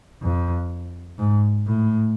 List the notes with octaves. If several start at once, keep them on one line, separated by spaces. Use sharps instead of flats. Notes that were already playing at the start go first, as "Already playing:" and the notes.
F2
G#2
A2